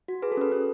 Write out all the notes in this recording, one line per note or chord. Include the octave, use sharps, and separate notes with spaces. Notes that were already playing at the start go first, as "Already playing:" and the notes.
F#4
G#4 B4
A4
C#4 B4
C#4 A4